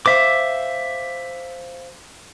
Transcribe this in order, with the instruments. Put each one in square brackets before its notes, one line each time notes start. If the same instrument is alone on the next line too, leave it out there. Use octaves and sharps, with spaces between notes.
[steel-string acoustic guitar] C5 F5 [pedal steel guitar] E5 D6